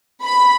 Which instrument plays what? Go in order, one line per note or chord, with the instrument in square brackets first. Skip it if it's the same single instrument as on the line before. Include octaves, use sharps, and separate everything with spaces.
[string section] B5